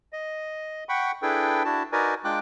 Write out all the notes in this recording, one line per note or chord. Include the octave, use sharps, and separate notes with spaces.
D#5
F#5 G5 B5 C#6
D4 E4 G#4 A4 B4 G5
D4 E4 F#4 A5
D#4 F#4 A#4 B4 D5 G#5
G#3 D4 F4 G5 D6 F#6